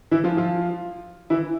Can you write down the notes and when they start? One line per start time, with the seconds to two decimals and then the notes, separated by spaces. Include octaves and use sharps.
0.11 E3 E4
0.24 F3 F4
0.37 F3 F4
1.30 E3 E4